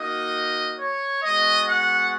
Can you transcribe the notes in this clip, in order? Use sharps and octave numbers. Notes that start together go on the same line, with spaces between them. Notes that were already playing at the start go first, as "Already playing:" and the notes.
Already playing: A#3 D#4 F#4 D#5
C#5
G#3 B3 F#4 D#5
F#5